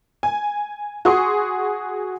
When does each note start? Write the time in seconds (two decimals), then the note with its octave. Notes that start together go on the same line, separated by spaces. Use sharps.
0.23 G#5
1.05 F#4 G#4 C6 C#6 D#6